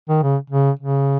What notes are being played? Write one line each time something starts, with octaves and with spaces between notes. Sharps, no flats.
D#3
C#3
C#3
C#3